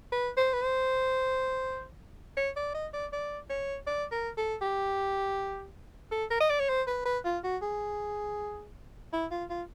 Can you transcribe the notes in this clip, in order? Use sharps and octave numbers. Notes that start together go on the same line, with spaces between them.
B4
C5
B4
C5
C#5
D5
D#5
D5
D5
C#5
D5
A#4
A4
G4
A4
A#4
D#5
D5
C#5
C5
B4
B4
F4
F#4
G#4
E4
F4
F4